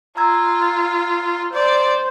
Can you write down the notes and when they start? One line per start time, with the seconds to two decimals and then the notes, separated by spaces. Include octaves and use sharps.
0.17 F4 A#5 E6 G#6
1.53 C5 D5